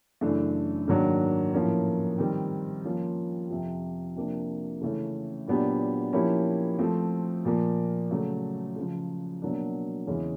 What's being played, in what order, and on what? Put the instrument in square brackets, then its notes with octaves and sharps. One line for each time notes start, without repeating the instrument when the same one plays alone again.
[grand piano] F#2 C#3 E3 A3 D4
G#2 D#3 F#3 A#3 D4
A2 F3 A#3 C#4
D#3 G3 C4
F3 A#3 C#4 F4
F2 C3 F3
C3 F3 A#3 D4
C#3 E3 A3 C#4
A#2 F#3 B3 D4 G4
F3 A#3 C#4 E4 G4
F3 A3 C4
A#2 F3 A#3
C#3 F#3 A3
C#3 F3 G#3
B2 F#3 A#3 D4
E2 C#3 E3 G#3 C#4